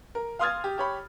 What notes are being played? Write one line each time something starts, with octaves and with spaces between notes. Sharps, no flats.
A#4
F5 C6 D#6 F6 G#6 A6
G4
G4 C#5 B5